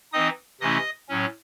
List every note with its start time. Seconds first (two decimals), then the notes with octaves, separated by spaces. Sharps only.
0.13 E3 C4 D#4 D#5 D#6
0.61 C3 E3 A3 C#4 E4 D#5 D#6
1.09 A2 F#3 C#4